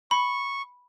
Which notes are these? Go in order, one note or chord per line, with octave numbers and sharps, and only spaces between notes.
B5 C#6